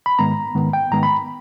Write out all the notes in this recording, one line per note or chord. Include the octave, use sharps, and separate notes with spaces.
B5
G#2 D#3 G#3 B3 A#5
G#2 D#3 G#3 B3
G5
G#2 D#3 G#3 B3 A#5
B5